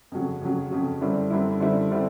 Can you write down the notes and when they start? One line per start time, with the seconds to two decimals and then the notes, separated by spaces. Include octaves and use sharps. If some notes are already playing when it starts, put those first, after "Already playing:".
0.12 F2 C#3 F#3
0.41 F2 C#3 F#3
0.71 F2 C#3 F#3
1.01 F#2 D3 G3 C4 E4
1.30 F#2 D3 G3 C4 E4
1.60 F#2 D3 G3 C4 E4
1.91 D3 G3 C4 E4